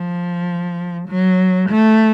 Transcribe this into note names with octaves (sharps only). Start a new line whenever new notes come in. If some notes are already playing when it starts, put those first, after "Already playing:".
Already playing: F3
F#3
A3